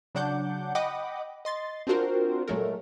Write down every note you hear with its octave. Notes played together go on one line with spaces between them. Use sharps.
C#3 F#3 D4 F#5 D6 G6
D#5 F#5 G5 B5 D6 D#6
D#5 C6 A6
C4 D4 F4 F#4 A#4 C5
A#2 F#3 G#3 A3 A4 A#4